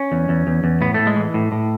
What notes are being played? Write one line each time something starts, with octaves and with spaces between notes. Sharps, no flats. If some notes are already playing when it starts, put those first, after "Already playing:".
Already playing: C#4
E2
E2
E2
E2
A2 B3
A2 A3
G#3
E3
A2
A2